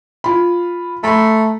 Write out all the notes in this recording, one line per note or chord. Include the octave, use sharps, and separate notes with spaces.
F4 B5
A3 A#5 B5